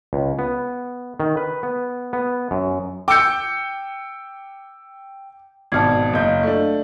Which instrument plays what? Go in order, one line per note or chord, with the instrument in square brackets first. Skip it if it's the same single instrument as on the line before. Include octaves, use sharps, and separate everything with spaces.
[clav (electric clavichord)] C#2
B3
D#3
B4
B3
B3
F#2
[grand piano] G5 G6 [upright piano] D6 E6 C#7
[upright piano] G#1 B2 D5 [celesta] A5 F6 G#6
[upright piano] F#1 G6 [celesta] D#5 F5
[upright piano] A3 D4